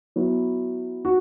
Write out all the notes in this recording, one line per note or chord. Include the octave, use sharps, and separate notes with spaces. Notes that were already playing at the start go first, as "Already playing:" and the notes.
F#3 B3 E4
F#4